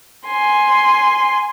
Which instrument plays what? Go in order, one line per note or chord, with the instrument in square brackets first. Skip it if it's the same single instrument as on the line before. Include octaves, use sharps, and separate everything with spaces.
[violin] G#5 C6